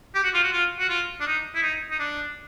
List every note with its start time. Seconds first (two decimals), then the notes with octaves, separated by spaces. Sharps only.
0.15 G4
0.24 F#4
0.34 F4
0.43 F#4
0.52 F4
0.79 F#4
0.89 F4
1.20 D4
1.26 D#4
1.55 E4
1.62 D#4
1.91 D#4
1.99 D4